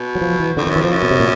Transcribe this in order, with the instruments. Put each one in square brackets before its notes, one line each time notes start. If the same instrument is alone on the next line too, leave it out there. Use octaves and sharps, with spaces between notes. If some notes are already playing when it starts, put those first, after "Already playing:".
Already playing: [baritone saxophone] B2
[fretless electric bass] F#3
F3
E3
[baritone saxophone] F2 [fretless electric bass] D3
[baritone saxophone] F#2 [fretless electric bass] D#3
[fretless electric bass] E3
[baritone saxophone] F2 [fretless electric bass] F3
[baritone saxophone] F#2
[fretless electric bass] B2
C3
A#2